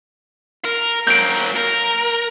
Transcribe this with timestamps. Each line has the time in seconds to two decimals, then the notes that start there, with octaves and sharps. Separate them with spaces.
0.65 A#4
1.07 F#3 A#3 G6 D7
1.56 A#4